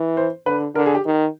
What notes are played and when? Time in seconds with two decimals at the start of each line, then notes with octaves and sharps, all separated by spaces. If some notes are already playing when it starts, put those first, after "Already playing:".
Already playing: E3
0.17 C5
0.46 D3 B4
0.75 D3 A#4
0.86 G#4
0.95 G4
1.05 D#3